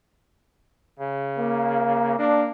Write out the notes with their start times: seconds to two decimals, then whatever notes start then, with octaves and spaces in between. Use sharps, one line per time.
0.99 C#3
1.38 A#3
2.18 A#3 D4